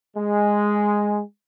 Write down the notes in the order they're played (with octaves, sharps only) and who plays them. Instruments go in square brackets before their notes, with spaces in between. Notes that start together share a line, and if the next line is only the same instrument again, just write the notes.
[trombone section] G#3